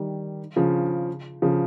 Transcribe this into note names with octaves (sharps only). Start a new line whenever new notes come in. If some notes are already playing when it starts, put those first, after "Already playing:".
Already playing: D#3 G3
C#3 F3
C#3 F3